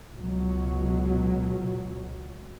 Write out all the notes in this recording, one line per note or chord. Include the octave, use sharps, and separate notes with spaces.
C#2 B2 F#3